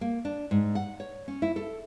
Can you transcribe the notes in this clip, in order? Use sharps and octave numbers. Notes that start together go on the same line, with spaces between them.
A#3
D4
G#2
F#5
C#5
C#4
E4
A4